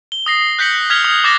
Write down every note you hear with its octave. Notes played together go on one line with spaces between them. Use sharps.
G7
D#6 A#6 C7
F#6 G6 B6 C#7 F#7
F6 G#6 B6 F7
D#6
D6 F#6 A6 A#6